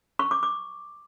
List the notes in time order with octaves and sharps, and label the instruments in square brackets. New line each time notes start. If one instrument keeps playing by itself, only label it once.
[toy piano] C#6
D6
D6